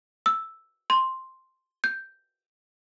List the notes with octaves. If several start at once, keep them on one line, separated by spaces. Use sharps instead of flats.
E6
C6
G6